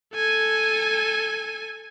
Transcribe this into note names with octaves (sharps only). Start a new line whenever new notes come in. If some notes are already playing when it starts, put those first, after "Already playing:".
A4 G#5